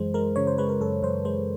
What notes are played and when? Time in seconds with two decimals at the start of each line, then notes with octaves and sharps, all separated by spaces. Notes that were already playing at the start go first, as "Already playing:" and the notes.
Already playing: F#2 E3 G#3 C5
0.14 G#3 A#4
0.36 C#3 C#5
0.47 C5
0.58 G#3 B4
0.69 A#4
0.81 F#2 A4
1.03 F#2 C5
1.25 G#3 C5